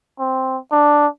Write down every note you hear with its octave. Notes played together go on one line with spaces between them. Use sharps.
C4
D4